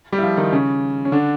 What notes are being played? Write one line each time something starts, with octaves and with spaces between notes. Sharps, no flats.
G3 G4
E4
F3 F4
D#3 D#4
C#3 C#4
C#4
D3 D4